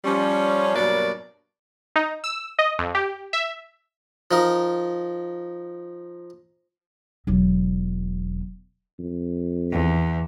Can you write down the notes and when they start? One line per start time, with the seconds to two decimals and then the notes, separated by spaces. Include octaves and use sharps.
0.05 F3 G3 C#4
0.75 G2 B2 F#3 A#3 A#4 D5
1.96 D#4
2.24 E6
2.59 D#5
2.79 F2
2.95 G4
3.33 E5
4.31 F3 D#4 A#4
7.27 E1 F#3
8.99 F2
9.72 E2